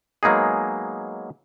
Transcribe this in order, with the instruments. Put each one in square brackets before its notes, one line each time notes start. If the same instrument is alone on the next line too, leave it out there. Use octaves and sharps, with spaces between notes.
[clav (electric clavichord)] F#3 G#3 A#3 B3 D#4 G#4